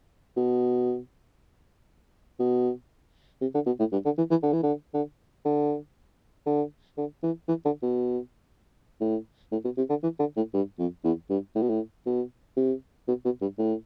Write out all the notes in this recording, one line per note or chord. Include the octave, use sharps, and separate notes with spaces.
B2
B2
C3
D3
B2
A2
G2
D3
E3
E3
D3
E3
D3
D3
D3
D3
D3
E3
E3
D3
B2
A2
A2
B2
C3
D3
E3
D3
A2
G2
F2
E2
G2
A2
B2
A2
B2
C3
B2
B2
G2
A2